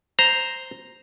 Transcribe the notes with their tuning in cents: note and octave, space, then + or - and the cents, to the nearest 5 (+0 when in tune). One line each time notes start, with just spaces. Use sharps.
C5 +0 A#5 +0